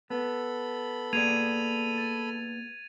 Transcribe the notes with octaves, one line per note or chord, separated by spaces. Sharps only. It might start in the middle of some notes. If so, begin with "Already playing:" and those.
B3 A4 B5
A#3 G#4 D5 G#6 D#7 F7
A6